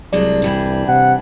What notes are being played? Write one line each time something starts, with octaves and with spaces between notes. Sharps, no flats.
C2 F#3 G#3 D4 D5
E3 G3 D4
C3 F#5